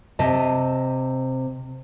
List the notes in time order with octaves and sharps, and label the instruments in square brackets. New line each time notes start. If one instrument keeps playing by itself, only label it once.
[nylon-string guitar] C3 D#5 A5